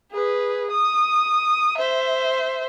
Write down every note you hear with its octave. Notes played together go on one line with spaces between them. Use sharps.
G#4 B4
D#6
C5 E5